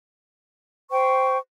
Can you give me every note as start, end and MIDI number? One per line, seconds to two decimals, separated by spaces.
0.91 1.38 72
0.91 1.38 79
0.91 1.38 85